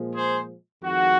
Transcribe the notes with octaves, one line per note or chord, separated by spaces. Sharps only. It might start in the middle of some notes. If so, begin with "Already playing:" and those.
Already playing: A#2 F3 G#3
G#4 C5
F2 D#3 G#3 F#4